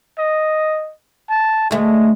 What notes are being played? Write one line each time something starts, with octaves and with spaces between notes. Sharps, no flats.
D#5
A5
D2 G#3 A3